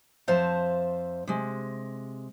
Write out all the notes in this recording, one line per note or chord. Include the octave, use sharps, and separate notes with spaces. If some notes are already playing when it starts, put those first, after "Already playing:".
F2 C5 E5 F5 A5
C3 G#3